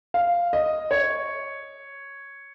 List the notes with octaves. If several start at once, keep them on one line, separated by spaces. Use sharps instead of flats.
F5
D#5
C#5